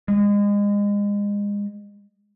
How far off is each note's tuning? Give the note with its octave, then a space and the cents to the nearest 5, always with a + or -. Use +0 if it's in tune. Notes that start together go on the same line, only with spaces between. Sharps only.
G#3 -30